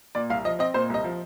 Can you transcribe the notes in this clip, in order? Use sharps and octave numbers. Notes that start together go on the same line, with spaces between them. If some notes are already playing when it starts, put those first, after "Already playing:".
A#2 D5
C2 F5
F3 D#5
C4 D#5
A#2 C5
C2 D#5
F3